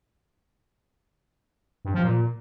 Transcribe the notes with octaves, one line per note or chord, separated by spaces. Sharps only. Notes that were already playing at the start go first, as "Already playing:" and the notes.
G2
F3
A#2